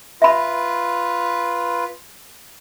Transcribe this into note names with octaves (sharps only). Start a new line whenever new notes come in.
F4 B4 E5 B5